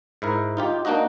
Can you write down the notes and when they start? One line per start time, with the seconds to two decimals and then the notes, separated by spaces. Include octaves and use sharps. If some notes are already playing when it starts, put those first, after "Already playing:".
0.22 G#2 E4 A#4
0.57 D#4 F4 G4
0.85 A#3 D4 D#4 F#4 D#5